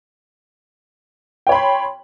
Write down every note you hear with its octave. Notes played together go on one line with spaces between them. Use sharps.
C#5 G5 B5 C6